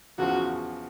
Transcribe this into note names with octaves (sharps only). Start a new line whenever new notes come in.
E2 C#3 F3 F#4